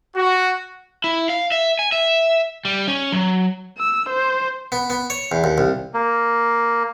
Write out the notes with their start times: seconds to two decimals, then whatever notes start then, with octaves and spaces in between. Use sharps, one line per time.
0.16 F#4
1.04 E4
1.29 F5
1.52 E5
1.79 G#5
1.92 E5
2.65 G3
2.88 C#4
3.12 F#3
3.78 E6
4.09 C5
4.72 B3
4.90 B3
5.10 C#5
5.32 E2
5.44 D#2
5.58 C2
5.94 A#3